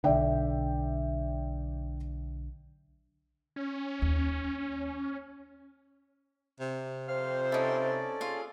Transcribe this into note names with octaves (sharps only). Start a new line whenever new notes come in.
B1 D3 D5 E5 G5
C#4
D#2
C3
F2 C5 F5 F6
C#4 D#4 E4 A4 D5
F4 G#4 F5